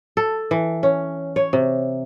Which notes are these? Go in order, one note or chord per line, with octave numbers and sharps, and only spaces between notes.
A4
E3
C#4
C#5
C3